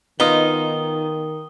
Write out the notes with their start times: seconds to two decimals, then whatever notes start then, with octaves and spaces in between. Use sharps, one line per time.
0.20 D#3 B3 D#4 F4 D#6 G7